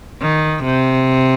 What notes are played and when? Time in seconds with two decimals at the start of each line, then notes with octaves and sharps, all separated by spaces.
0.21 D#3
0.64 C3